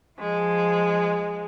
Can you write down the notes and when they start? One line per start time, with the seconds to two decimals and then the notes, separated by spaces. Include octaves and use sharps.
0.18 F3 G#3